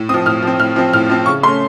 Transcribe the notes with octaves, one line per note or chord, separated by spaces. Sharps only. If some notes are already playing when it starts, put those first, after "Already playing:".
Already playing: A2
F3 C4 D#6
A2 F6
F3 C4
A2 F6
F3 C4
A2 F6
F3 C4
C#3 C#6
A3 C#4 C6